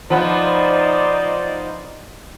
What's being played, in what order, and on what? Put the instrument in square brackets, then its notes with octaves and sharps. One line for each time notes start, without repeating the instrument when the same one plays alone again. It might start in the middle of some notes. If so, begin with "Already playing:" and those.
[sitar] F3 B3 [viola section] D#4 C5 D5